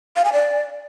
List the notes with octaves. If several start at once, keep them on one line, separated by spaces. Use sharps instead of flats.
F5
G#5
D5